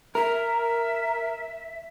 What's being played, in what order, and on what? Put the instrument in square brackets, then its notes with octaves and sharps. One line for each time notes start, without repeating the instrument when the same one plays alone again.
[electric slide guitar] A#4 [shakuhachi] E5